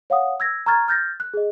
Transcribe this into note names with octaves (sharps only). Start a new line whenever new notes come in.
C#5 F5 F#5 D#6
E6 G#6 A#6
A#5 C#6 F6 G#6 A6
F6 G6 A6 A#6
F#6
G#4 D#5